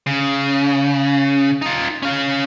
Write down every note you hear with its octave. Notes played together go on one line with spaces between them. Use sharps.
C#3
D#4 F4
C#4 F5